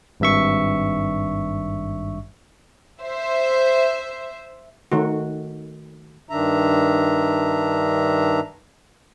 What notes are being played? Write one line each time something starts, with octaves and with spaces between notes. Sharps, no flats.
G#1 G2 E5 C#6
C5 E5
D#3 A3 F#4
G2 D#3 D4 E5 A#5